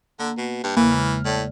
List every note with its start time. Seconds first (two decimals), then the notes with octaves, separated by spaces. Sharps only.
0.20 D3 A#3
0.37 B2
0.64 G2
0.77 E2 C#3 E3 A#3
0.91 C#3 G#3 A#3 F6
1.25 A2 D5 A5